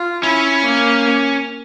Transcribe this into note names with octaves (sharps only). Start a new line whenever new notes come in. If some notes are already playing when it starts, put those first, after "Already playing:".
Already playing: F4
C#4 E4
A#3